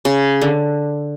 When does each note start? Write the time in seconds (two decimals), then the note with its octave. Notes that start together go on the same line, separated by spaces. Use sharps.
0.05 C#3
0.42 D3